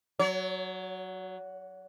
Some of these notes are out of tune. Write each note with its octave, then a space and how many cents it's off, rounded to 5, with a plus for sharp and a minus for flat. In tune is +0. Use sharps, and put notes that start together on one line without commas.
F#3 +0 C#5 +40